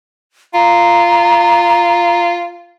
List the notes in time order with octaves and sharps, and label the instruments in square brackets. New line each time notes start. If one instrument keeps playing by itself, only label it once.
[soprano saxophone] F4 [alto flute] A#5